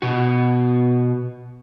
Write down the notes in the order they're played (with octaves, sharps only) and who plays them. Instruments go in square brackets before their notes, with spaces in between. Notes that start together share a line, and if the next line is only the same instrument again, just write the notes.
[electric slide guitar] B2 F#4